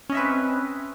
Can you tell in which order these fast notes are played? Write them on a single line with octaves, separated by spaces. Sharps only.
C#4 D#5 E5 B4 C4